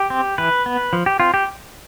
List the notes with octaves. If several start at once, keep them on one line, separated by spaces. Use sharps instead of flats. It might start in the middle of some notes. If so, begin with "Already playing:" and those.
Already playing: G4
C4
E3 B4
B3
F3
G4
C4 F4
G4